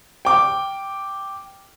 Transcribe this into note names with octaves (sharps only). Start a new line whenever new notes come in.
G5 D6